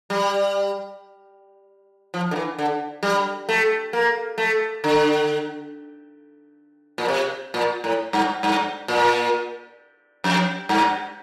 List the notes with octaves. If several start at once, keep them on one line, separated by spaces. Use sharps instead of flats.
G3
F3
D3
E3
D3
G3
A3
A#3
A3
D3
A#2
C3
A#2
A2
G2
G2
A#2
F2
G2